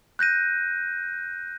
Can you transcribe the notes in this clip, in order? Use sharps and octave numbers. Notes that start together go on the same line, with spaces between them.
F#6 G6 A#6 D#7